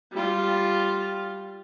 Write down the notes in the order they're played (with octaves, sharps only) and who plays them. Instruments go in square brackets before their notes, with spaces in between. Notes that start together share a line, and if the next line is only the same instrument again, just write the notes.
[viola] G3 F4